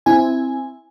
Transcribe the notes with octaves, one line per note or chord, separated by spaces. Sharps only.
C4 E4 G#5